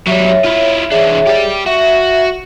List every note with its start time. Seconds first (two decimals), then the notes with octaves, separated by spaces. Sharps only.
0.08 F#3 G3 C#5 E5
0.45 E4 F4
0.91 E3 D4 G#4 C#5 E5
1.27 G4 D5
1.66 F#4 E5